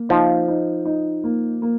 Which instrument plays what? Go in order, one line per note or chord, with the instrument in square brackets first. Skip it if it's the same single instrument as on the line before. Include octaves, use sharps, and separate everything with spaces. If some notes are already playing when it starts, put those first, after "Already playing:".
Already playing: [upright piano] A#3
[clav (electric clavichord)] F3 [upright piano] D#4
[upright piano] D#4
D#4
A#3
A#3